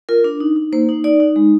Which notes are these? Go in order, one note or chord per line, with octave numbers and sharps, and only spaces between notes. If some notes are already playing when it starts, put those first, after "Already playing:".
F4 A#4
D4
D#4
D#4
A#3 C5
D#4
D#4 D5
D#4
G#3